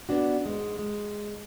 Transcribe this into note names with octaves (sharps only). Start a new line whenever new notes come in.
B3 C#4 D4 F#4
G#2 G#3
G#3